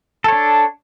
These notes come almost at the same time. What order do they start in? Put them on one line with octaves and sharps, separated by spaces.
A4 C#5 D4